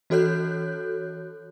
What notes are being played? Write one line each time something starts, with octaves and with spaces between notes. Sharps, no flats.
E3 F#4 A4 C#5 F#6 G6